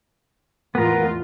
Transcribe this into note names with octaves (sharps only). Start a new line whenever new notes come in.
E2 A2 B3 F4 A#4